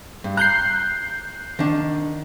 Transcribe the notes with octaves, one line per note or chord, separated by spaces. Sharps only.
G2
A#5 F#6 G6 C7
D#3 D4